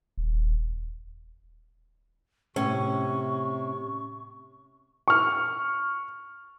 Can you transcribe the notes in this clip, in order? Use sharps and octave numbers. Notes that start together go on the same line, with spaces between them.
D#1
A2 C3 C#4 C#6
C#6 F6